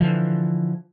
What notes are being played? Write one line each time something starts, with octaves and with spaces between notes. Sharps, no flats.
D3 E3 F3